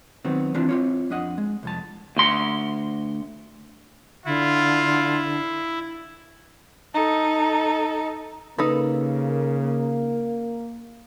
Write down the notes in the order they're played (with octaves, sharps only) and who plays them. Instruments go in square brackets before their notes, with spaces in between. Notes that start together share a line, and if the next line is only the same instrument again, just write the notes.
[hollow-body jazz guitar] D#3 F#3 B3 C4
E3 C4 D4 E4 F4 A5
C4 F4 C#5
F2 D4 D#5 F#5
G#3
C2 F2 A5
[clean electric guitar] D2 C6
[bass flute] D3 [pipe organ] E4 [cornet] F4
[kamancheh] D#4 A4
[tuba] C#3 [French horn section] A#3 [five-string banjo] D#4 A4 B4